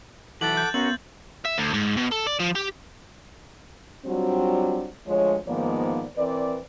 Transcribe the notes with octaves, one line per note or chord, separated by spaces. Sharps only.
E3 F#3 E4 A4 F#5 D6 A6 F#7
G6
B3 C#4 F#4 A#4 F#7
E5
D2
G#2
B2
A4
D5
F3
G4
F#3 G3 C4 D4 F4 F#4
D2 F3 G#3 C#5
G#2 D#3 F3 A#3 B3 D5
E3 C4 A#4 B4 D5